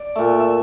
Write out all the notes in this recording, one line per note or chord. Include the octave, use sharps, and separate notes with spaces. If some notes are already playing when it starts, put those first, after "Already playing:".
Already playing: D5
A#2 A3 E5
E5